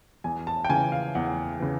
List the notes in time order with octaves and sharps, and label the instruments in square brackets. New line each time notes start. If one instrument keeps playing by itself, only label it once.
[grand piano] E2 G#5
A5
G5
C#3 E3 G#5
F5
E2 F#5
C#3 E3